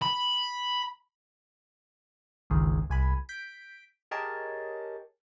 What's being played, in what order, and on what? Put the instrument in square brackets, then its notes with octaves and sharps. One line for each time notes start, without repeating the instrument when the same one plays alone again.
[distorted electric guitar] B5
[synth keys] G1 C#2 D#3 G#4
C2 G#5 B5
G6 B6 D7
G4 G#4 A#4 C#5 D#5 A5